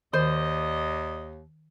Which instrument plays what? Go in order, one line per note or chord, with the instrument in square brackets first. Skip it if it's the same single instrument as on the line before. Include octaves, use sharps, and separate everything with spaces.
[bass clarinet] D#2 [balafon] D#3 [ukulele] C5 [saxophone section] D5 D#5